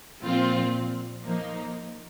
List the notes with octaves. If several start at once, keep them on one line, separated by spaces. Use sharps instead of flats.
A#2 F3 C4 F4
F3 A#3 D#4